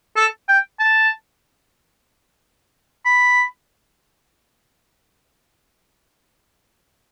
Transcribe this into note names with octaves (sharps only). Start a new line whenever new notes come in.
A4
G5
A5
B5